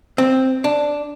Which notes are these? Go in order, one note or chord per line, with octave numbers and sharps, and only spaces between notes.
C4
D4